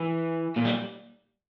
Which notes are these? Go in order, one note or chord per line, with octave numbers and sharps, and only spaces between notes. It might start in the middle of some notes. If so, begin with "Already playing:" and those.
Already playing: E3
A#2
G3